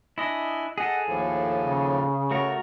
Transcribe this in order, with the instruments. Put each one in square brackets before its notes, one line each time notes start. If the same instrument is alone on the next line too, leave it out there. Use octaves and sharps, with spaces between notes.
[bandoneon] D4 G#5 [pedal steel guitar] E4 D#5
[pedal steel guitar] G#4 A4 [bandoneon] D#5 F#5
[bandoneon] D#2 A2 F3
[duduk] C#3
[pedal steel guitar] A3 F#4 A#4 [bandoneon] C#5